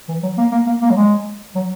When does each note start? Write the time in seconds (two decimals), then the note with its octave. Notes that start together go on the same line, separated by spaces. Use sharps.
0.08 E3
0.23 F#3
0.38 A#3
0.52 A#3
0.67 A#3
0.82 A#3
0.90 F#3
0.96 G#3
1.55 F#3